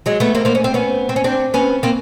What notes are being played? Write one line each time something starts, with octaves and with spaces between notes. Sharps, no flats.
F#3 G#3
A3 B3
A#3 C4
A#3 C4
C#4
C4
B3 C#4
C4
C#4
C4 D4
B3 C#4
A#3 C4